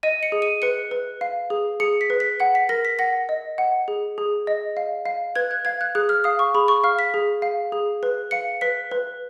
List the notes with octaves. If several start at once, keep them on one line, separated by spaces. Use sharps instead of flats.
D#5 D#7
C#7
G#4
D#7
B4 C#7
B4
F5
G#4
G#4 C#7
B6
B4
B6
F#5 C#7
B6
A#4 A#6
B6
F#5 A#6
D#5
F#5
G#4
G#4
D#5
F5
F5
B4 G#6
F#6
F5 G#6
F#6
G#4 F#6
F6
F5 D#6
C#6
G#4 B5
C#6
F5 F6
B6
G#4
F5
G#4
B4
F5 C#7
B4 B6
B4